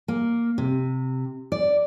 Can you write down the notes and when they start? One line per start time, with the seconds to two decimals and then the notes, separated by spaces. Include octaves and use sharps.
0.08 A#3
0.58 C3
1.52 D5